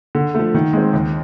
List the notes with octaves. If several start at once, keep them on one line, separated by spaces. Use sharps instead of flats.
D3
F3 A3
D#3
G#3 C4
D#2